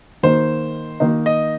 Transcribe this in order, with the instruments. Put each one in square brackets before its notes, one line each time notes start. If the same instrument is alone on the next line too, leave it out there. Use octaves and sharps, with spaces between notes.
[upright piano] D#3 A#3 D#4 [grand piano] C5
[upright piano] D#3 A#3 D#4
[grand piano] D#5